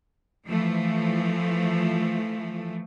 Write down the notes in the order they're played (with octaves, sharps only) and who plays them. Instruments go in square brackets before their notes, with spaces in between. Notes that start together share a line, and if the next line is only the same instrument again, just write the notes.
[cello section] E3 F3 A3